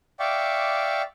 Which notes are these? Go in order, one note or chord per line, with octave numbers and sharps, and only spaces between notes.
D5 E5 F5 G5 C#6 D6